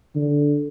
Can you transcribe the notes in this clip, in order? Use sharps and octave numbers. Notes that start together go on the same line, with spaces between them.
D3